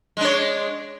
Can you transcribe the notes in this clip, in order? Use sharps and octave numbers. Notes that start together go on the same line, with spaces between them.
G#3 D4 C#5